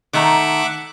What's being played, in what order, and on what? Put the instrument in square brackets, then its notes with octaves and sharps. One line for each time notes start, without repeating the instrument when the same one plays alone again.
[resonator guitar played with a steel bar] D#3 A3 A#5 [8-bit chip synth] E5 F#5 D6